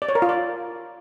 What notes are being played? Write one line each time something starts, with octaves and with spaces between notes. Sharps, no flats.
D5
C#5
A#4
F4
D5